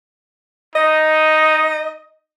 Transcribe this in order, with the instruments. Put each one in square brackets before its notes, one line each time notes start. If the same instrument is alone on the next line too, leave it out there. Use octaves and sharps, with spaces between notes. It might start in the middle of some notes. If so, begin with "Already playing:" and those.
[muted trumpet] D#4 [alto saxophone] D#5